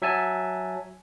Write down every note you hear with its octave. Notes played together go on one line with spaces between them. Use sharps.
F#3 E5 G#5 A5